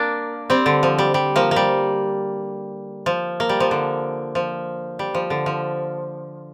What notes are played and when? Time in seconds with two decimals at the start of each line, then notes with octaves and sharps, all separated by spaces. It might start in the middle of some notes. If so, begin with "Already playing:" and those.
Already playing: A#3 D4
0.50 G3 C4
0.66 D3
0.83 F3
0.99 G3
1.14 G3
1.36 F3 A#3
1.51 A#3
1.56 G3
3.06 F3
3.40 A#3
3.49 G3
3.60 F3
3.71 D3
4.35 F3
4.99 G3
5.15 F3
5.30 D3
5.46 F3